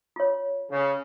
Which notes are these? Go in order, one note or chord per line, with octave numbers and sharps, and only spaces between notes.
F4 C#5
C#3